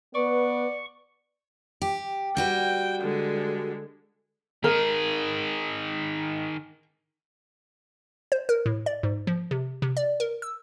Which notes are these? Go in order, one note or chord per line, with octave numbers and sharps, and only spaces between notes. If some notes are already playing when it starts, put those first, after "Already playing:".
B3 B4 D5 C#6
G4
G3 F#4 B4 G5
D3 G#3
D#3 G#4 A#4
C5
A#4
A2
D5
G#2
F3
C3
C3
D5
A#4
E6